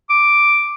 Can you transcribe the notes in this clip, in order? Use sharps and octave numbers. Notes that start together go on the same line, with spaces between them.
D6